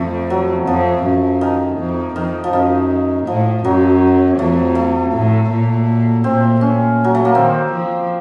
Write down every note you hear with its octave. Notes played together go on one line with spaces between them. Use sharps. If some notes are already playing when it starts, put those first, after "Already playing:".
Already playing: F2 A3
F#3
F2 F3
F#2
D#3
F2
F2 D#3
F3
F#2 D#3
A2 F3
F#2 F#3
F2 A3
A3
A2
A#2
A#2 C4
A#2 C#4
F#3
A3
A#3
D#3 C4
F3